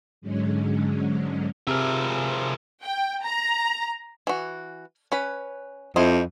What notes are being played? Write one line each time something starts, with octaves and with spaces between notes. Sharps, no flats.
G#2 D3 F#3 G#3 C#4
C3 F3 G#4 A#4 E5 F6
G5
A#5
E3 F#4
C#4 B4
F2 E4 C5 D#5